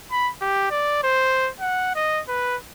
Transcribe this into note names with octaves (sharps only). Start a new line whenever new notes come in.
B5
G4
D5
C5
F#5
D#5
B4